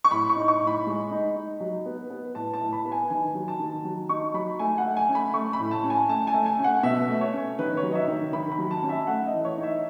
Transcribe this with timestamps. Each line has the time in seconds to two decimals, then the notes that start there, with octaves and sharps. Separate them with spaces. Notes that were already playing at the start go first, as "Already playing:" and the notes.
0.04 C#6
0.11 A2 B5
0.30 C#6
0.36 D#4
0.48 C#6
0.61 A2
0.67 B5
0.86 G#3
1.11 D#4
1.36 D#4
1.60 F#3
1.86 B3
2.10 B3
2.35 A2 A5
2.54 A5
2.61 A2
2.73 B5
2.85 B3
2.92 G#5
3.10 D#3 G#5
3.34 F#3
3.48 A5
3.59 D#3
3.84 F#3
4.09 D#4 C#6
4.34 F#3 B5
4.59 A3 G#5
4.78 F#5
4.84 A3
4.97 G#5
5.09 C#4
5.15 B5
5.34 A3 C#6
5.53 B5
5.60 A2
5.71 A5
5.84 C#4
5.90 G#5
6.09 A3 A5
6.27 G#5
6.34 A3
6.46 G#5
6.59 C#4
6.64 F#5
6.83 B2 E5
7.08 A3
7.21 C#5
7.33 C#4
7.59 D#3 B4
7.77 C#5
7.83 F#3
7.92 D#5
7.95 E5
8.08 D#3
8.33 D#3 B5
8.52 B5
8.58 F#3
8.71 A5
8.83 C#4
8.89 E5
9.07 A3 F#5
9.26 D#5
9.33 E3
9.45 C#5
9.57 D#4
9.63 E5